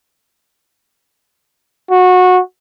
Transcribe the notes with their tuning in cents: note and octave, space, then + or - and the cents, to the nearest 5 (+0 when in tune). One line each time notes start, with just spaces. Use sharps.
F#4 -20